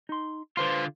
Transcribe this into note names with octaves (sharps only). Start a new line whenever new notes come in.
D#4 C6
D3 F4 B4 C5 C6